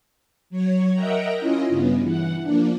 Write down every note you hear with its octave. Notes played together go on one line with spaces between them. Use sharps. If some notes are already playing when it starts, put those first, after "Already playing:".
F#3 C#5
A#4 D#5 E5 F#5 G5 A#5
C#4 E4 F4 D#5
G2 C#3 B3
E3 F#5
F3 A#3 D4